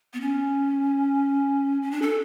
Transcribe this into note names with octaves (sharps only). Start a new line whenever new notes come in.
B3
C#4
C#4
D4
A4